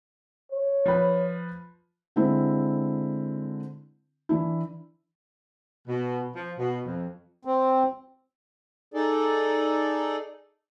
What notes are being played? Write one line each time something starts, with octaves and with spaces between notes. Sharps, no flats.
C#5
F3 B4
D3 G#3 C4 E4
E3 D4 E4
B2
F3
B2
F2
C4
D#4 G#4 A4 D5